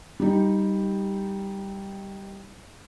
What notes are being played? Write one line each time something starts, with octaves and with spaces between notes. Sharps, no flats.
G3 D#4 G4